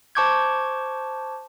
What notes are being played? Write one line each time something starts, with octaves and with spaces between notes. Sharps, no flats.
C5 A5 C#6 D6 G6 G#6